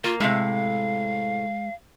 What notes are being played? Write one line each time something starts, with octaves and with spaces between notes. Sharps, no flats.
A#3 F4
A2 C3 G#3 F5